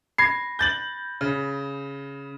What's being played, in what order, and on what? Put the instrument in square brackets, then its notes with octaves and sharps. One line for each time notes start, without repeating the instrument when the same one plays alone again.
[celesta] B5 A#6 [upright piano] G#6 C7
[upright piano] G6 A6 F#7
C#3